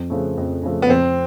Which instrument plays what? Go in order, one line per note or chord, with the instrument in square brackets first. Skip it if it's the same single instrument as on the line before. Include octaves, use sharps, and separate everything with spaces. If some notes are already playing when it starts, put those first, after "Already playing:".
Already playing: [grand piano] F2
C#3 F3 A3
F2
C#3 F3 A3
[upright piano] B3
[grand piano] F2 [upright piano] C4